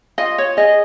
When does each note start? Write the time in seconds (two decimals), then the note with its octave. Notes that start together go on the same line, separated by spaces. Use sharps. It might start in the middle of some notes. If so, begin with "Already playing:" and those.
0.18 F4 D#5
0.38 C#5
0.57 G#4 D#5